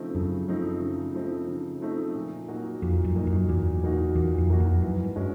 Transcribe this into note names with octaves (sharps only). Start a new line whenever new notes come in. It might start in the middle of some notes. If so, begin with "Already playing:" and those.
Already playing: C#3 F3 A3 C4 D#4
F#2 C#3
F3 A3 C4 D#4
C#3
F3 A3 C4 D#4
C#3
F3 A3 C4 D#4
A#2
F#3 A#3 D#4 F#4
F2 A#2
F#2
F#3 A#3 D#4 F#4
F#2
E2 A#2
F#3 A#3 D#4 F#4
E2 A#2
F2
F#3 A#3 D#4 F#4
F2
F#2 E3
G2
G#3 C#4 F#4